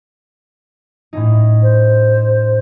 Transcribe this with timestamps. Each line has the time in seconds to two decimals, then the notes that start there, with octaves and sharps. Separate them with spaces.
1.13 A2 C#4 D#4
1.62 C5